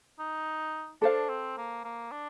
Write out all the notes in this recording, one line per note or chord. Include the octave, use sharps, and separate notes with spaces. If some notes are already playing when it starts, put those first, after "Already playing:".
D#4
D4 A4 C5 F5
C4
A#3
A#3
D4